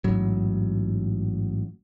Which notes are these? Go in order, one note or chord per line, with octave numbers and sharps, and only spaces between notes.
A1 G#2 F#3